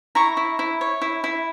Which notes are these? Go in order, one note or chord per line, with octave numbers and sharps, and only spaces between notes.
E4 A#5 C#6
E4
E4
C#5
E4
E4